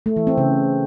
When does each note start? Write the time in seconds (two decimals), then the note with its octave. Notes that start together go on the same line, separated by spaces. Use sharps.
0.06 A3
0.16 E3
0.27 C4
0.37 C#3